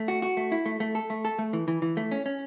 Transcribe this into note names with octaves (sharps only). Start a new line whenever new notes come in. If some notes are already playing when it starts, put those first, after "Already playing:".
Already playing: A3
F#4
F#4
A3
E4
A3
A3
A4
A3
A4
A3
E3
E3
E3
A3
C#4
C#4